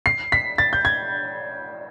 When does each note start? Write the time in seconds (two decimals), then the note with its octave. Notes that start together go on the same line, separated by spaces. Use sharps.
0.06 C7
0.32 B6
0.58 A6
0.73 G6
0.85 G#6